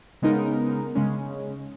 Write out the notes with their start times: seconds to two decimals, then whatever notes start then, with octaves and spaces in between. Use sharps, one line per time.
0.22 C#3 G#3 B3 D#4 A#4
0.95 C#3 G#3 C#4